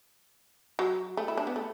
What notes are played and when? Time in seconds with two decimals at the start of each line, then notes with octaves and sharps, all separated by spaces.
0.79 F#3
1.17 A3
1.28 E4
1.37 D4
1.47 B3
1.56 A3